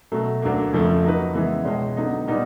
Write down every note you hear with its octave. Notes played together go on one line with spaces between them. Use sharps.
B2 F#3 A3
D2 D3 F#3 A#3
F2 C#3 F3 A3
F#3 A#3 D#4 F#4 B4
C#3 E3 G#3 B3 E4
C#2 B2 G#3 C#4
D3 F#3 B3 D#4
A#2 G3 B3 D#4